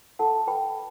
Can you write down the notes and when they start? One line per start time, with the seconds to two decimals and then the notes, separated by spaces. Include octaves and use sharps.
0.19 A4 F#5 A5
0.47 B4 G5 B5